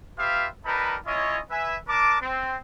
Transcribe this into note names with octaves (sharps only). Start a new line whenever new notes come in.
F4 G4 B4 E5 F5
G3 D#4 A#4 B4 A5 B5
C#4 E4 F4 C#5 D#5
B4 E5 G#5
D4 A#4 A5 D6
C4